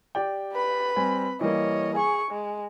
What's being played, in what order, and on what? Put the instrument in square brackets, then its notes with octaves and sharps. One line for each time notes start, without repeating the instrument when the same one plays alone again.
[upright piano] G4 D5 G5
[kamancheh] B4 B5
[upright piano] G3 C4 G#5
[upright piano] E3 G3 A#3 [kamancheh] C#5 D#5
[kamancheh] G#4 C#6 [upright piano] G#5
[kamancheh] G#3